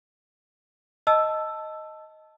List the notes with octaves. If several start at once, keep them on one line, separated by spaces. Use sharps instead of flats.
D#5 A5 E6